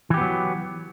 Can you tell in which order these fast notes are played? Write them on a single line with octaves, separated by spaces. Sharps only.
E3 G4 B3 F#3